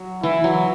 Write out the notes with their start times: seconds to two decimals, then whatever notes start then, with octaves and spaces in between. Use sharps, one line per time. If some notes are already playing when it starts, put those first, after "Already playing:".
Already playing: F#3
0.23 E3 E4
0.44 F#3